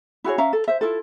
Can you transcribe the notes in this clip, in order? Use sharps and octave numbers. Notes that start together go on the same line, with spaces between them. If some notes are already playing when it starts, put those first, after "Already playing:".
E4 F#4 G#4 C#5
C#4 E5 F5 A#5
A4
C5 E5
E4 F4 A4